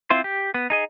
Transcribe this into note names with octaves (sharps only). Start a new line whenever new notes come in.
C4 E4 F4 C5
G4
B3
D#4 G#4 D#5